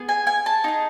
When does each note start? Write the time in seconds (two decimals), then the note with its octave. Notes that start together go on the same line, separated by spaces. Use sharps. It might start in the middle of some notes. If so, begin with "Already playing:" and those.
Already playing: B3 G#4
0.09 G#5
0.27 G#5
0.46 A5
0.64 D#4 G#4